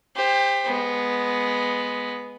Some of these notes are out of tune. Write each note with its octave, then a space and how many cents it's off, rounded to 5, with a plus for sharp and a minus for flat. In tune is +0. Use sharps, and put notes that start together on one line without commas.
G4 +25 C5 +0
G#3 +0 B3 +0